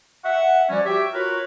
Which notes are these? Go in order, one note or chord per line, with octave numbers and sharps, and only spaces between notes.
E5 F#5
F3 G3 C#4 F#4 D5
F#4 G4 C#5 E5 G5
F4 F#4 A#4 B4 C#5